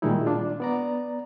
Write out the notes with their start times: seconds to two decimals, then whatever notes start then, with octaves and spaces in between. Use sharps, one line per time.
0.02 A#2 D#3 G3 G#3 D#4 E4
0.26 D4 F4
0.60 B3 D5 A#5